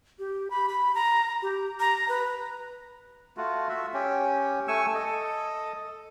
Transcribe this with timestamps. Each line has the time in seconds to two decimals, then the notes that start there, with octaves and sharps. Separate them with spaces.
0.19 G4
0.50 B5
0.69 B5
0.95 A#5
1.42 G4
1.80 A#5
2.09 B4
3.37 A3 F4 F#4
3.69 F#4 E5
3.94 C#4 G4
4.68 A3 G#5 C#6 E6
4.94 A4 D#5